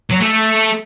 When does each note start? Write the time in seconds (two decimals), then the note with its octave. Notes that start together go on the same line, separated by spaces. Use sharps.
0.11 F#3
0.21 A3